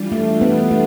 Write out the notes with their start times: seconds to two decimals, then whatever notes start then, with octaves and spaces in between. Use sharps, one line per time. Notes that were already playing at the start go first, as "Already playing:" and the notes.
Already playing: E3 G3 D4 F4
0.12 A3
0.41 B3
0.71 A3